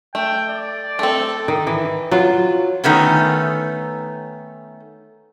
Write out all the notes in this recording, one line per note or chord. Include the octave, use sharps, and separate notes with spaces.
A3 G5
D5
A3 C4 A4
D#3
E3
F#3 F4
D#3 A3 B3 C#4